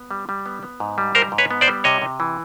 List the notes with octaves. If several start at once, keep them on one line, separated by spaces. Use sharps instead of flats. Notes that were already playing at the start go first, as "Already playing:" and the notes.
Already playing: B3
G3
G3
B3
B3
G#2
G3
G#2 A#4 C5
G#2
B4 C#5
B3
C5 D5
G3
C3 C#5 D#5
C3
E3